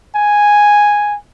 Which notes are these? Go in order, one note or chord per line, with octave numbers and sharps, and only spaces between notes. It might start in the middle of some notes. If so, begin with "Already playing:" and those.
G#5